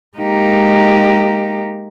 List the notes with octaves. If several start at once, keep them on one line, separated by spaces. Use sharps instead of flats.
G#3 A#3 D#4 G4